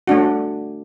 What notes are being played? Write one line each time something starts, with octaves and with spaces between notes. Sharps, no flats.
A3 D4 F#4